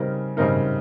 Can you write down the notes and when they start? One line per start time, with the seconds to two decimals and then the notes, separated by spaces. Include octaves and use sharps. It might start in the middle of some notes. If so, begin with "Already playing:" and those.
Already playing: C#3 G3 C4 D#4 A#4
0.37 C#3 G3 C4 D#4 A#4